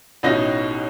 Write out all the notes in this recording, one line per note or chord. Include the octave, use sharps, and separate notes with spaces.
A1 B2 C#4 D#4 E4 A#6